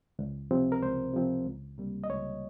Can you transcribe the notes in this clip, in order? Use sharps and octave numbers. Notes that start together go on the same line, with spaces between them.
C#2
C3 F3 C4
A#4
C#2 C5
C3 F3 C4
C#2
C3 G3 A#3
D#5
C#2 C#5